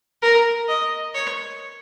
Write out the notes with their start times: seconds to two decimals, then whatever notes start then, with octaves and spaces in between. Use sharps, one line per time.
0.22 A#4
0.68 D#5
1.14 C#5